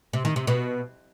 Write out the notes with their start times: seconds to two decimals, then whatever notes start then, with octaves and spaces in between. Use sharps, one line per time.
0.13 C3
0.25 D#3
0.36 C3
0.47 B2